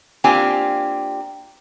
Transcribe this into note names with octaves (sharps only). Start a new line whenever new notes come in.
A#3 C4 D4 F4 G4 G#5